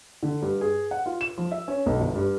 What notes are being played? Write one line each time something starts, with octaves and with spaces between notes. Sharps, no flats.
D3
G2
G#4
F#5
F4
E7
F3
E5
C#4
B1
G1
G2